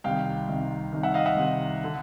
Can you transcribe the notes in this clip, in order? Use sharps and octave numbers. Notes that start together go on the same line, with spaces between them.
C2 C3 D#3 F5 G5
C2 C3 D#3
C2 C3 D#3
E5 F#5
D#5 F5
E5 F#5
C2 C3 D#3
D3